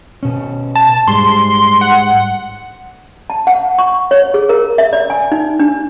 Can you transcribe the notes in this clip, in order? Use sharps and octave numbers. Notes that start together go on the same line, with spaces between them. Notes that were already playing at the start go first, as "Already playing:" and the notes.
B2 C#4
A5
G#2 G3 G#3 C6
F#5
A5
F#5
C#6
C#5
G#4
A#4
E5
D5
G#5
D#4
D4